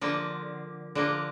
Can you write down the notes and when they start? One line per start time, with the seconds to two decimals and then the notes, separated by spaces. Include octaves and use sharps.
0.01 D3 F3 A#3
0.95 D3 F3 A#3